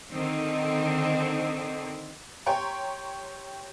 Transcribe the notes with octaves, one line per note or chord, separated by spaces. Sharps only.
D3 D#3 C4
G4 C#5 G5 A#5 C6 C#6